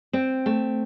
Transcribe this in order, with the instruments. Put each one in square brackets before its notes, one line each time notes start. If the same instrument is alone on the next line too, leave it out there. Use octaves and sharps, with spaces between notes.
[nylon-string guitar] C4
A3